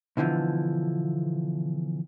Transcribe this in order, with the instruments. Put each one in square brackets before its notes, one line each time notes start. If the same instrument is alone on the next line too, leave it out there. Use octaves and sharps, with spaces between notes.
[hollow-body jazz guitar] B2 D3 E3 F3